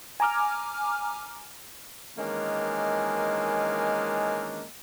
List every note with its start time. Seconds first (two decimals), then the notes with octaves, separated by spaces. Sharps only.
0.20 G#5 A#5 D6 F6
2.17 D#3 E3 G#3 A#3 C#4 D4